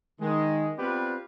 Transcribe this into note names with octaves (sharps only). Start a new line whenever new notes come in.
D#3 G#3
B3 C4 F4 G4 B4 D5